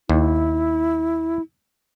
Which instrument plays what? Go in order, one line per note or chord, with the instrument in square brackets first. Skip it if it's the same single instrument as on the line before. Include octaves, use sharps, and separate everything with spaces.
[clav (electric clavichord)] D#2 [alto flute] E4